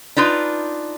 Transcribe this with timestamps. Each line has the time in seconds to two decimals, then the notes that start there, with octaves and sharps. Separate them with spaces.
0.17 D4 D#4 F4 B4